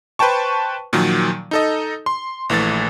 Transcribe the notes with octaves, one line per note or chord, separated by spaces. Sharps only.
B4 C5 G5 A5 C#6
A#2 D#3 F3 F#3
D#4 A4 D#5
C6
A#1 E3 A3 A6